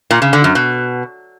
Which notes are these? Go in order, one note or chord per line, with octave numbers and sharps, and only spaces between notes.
A#2
C#3
D3
F#2
B2